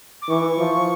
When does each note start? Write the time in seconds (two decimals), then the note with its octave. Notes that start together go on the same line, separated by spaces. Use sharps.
0.22 D6
0.29 E3 C#6
0.58 F3